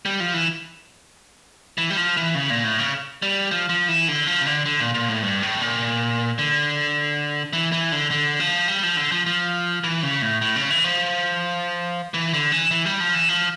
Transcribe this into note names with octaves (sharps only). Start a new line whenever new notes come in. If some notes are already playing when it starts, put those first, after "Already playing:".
G3
F3
E3
E3
G3
F3
E3
C#3
A#2
A2
C#3
G3
F3
F3
E3
D3
F3
C#3
D3
D3
A#2
A#2
A2
G2
A2
A#2
D3
E3
E3
D3
D3
F3
G3
F3
D3
F3
F3
E3
C#3
A2
A2
C#3
E3
F3
E3
D3
E3
E3
G3
F3
E3
F3